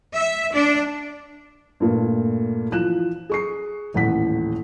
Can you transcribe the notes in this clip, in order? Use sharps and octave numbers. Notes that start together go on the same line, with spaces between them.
E5
D4
G2 A#2 A3
E3 F3 F#6 E7
G#4 C#6 C7
D#1 A1 F#5 B6